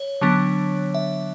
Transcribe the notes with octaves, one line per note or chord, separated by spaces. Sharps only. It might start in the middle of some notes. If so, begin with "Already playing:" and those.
Already playing: C#5
D3 F#3 B3 D4
E5